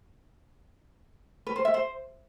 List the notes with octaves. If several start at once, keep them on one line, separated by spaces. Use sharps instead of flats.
B4
C5
E5
C5